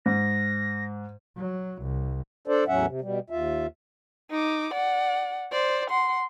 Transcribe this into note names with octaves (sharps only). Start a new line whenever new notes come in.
G#2 A#6
F#3
C2
D4 A4 C5 D5
E2 A2 F#3 C#4 E5 F#5
C3
B2 G3
D#2 F4 E5
D#4 D6
D5 F#5
C5 D5
F#5 C6